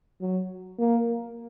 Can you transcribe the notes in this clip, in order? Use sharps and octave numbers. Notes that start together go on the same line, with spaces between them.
F#3
A#3